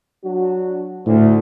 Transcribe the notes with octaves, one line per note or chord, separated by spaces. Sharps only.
F#3 D4 F#4
D2 A2